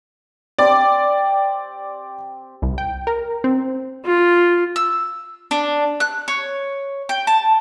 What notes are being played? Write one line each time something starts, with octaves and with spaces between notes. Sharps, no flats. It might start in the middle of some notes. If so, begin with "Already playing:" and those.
C4 G4 D5 D6
C2
G5
A#4
C4
F4
E6
D4
F#6
C#5
G5
A5